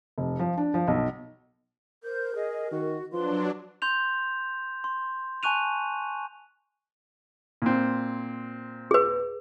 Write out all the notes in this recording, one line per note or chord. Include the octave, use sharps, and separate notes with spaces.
F1
F3
D4
F3
B1
A#4 C5 G6
G#4 D#5
D#3 F#4
F3 F#3 D4 B4 C6
C6 G6 F7
C6
G#5 A5 C#6 F#6 D#7 F7
A#2 C4
G#4 B4